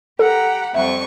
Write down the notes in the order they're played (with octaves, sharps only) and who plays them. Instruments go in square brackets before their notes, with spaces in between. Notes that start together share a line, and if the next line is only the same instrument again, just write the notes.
[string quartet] G4 A#5 B5 [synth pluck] A4 [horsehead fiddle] F#5
[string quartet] F2 G3 C#6 [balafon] E5